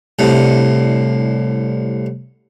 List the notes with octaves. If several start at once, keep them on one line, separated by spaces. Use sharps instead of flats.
C2 A2 D3